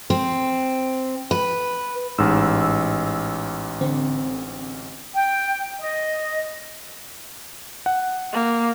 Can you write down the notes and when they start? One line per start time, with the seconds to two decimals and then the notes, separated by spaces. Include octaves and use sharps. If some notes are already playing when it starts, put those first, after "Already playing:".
0.10 C4
1.31 B4
2.18 A1 G#2 E6
3.81 D3 C4
5.13 G5
5.80 D#5
7.86 F#5
8.33 A#3